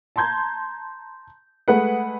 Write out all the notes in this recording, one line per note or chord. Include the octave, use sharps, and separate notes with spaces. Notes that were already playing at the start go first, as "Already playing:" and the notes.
A5 A#5 C6 G6 G#6
G#3 A3 G#4 B4 F#5